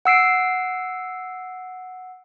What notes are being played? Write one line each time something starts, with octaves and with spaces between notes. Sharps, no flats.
F#5 E6 C7 D7